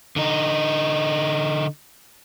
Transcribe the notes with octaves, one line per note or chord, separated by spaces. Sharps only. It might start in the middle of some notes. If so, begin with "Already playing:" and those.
D3 D#4